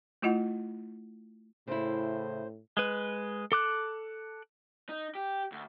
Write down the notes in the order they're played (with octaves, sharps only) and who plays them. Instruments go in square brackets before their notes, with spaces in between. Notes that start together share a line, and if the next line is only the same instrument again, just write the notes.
[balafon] A3 E4 F4 D#5 F#5
[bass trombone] A2 [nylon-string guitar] C#3 E4 [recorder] C5
[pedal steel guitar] G#3 B4
A4 D6 F#6
[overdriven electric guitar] D#4
G4
D2